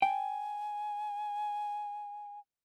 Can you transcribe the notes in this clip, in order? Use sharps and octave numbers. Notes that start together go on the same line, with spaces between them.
G5 G#5